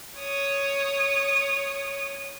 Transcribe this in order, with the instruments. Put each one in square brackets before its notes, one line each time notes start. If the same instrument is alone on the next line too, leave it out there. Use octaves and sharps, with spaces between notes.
[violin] C#5 D#6